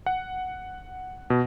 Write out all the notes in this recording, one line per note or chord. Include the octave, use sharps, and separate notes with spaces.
F#5
B2